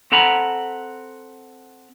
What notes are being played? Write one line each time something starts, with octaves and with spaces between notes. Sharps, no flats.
C4 A4 F#5 A#5 B5